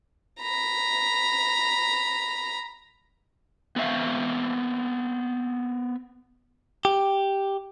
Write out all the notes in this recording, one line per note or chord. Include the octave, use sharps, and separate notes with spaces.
A#5 B5
B3 C4 E5 F5
G4